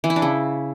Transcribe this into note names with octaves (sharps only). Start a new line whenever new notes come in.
E3
E4
D4
C#3